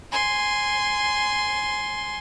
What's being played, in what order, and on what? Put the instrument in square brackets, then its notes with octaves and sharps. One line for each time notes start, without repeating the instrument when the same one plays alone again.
[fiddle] G#5 C6